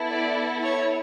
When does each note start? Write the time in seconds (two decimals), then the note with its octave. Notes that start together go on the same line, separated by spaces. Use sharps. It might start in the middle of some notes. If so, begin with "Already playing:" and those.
Already playing: B3 E4 A4
0.10 D5
0.63 C#5